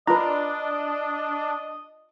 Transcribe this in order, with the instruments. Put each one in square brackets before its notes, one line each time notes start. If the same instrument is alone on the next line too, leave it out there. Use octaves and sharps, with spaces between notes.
[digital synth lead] D4 [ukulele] F4 D5 [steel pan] B4 A#5 [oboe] D#5